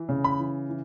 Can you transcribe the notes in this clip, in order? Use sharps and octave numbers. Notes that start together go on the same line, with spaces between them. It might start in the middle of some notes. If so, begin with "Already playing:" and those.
Already playing: E3
C#3
B5
E3
E3